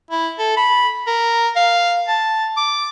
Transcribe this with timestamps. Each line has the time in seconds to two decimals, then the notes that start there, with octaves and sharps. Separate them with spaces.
0.11 E4
0.39 A4
0.57 B5
1.07 A#4
1.56 F5
2.08 A5
2.57 D6